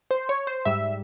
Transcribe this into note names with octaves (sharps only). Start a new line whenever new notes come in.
C5
C#5
C5
G#2 G3 E5